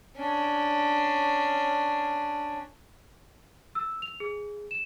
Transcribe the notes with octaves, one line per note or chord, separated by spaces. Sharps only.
C#4 D4
E6
F7
G#4
E7